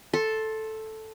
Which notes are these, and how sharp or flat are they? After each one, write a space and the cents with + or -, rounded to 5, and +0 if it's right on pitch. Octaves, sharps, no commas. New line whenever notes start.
A4 +0 C6 +20